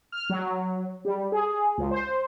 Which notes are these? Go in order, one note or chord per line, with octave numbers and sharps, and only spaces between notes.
F6
F#3
G3
G#4
C#2
C5